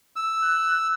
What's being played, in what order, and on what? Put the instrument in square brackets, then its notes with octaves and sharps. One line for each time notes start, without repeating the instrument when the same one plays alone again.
[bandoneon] E6
[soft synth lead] F#6